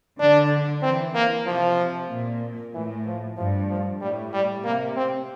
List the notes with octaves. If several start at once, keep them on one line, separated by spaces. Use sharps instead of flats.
D3 D4
E3 C4
A#3
C3 F3
A#2
A2 E3
F3
G2 F3
F3
A2 G3
G3
C3 A#3
C4